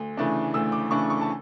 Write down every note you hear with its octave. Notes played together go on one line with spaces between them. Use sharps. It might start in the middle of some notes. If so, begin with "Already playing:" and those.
Already playing: D2
C#3 E3 A3 D4
D2 E6
D6
C#3 E3 A3 D4 C#6
C#6
A5